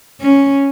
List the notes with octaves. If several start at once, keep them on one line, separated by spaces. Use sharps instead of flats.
C#4